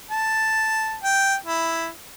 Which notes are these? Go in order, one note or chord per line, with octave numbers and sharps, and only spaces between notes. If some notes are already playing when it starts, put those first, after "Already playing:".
A5
G5
E4